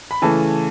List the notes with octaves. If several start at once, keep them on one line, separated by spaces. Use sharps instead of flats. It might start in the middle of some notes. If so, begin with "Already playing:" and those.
B5
C#3 E3 A3 A5